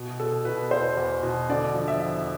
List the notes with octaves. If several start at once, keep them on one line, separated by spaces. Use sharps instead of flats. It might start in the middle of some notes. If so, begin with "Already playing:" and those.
Already playing: B2
B2 A4
B2 B4
E2 C5
E2
B2
D3 D5
F3
E5
E2